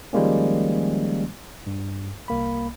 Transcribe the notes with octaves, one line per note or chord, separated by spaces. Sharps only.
D#3 F3 G3 G#3 A#3 C#4
G2
C2 A#3 B5